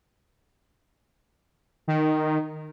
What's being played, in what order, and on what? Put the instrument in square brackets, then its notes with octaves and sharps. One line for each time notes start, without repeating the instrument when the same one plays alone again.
[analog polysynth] D#3